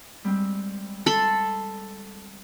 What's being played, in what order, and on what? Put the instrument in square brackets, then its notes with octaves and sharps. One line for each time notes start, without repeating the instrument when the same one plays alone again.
[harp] G3 G#3 C4
[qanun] A4 B5 C6